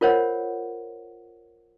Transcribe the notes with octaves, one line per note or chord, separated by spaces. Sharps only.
F4 A#4 C5 C#5 F#5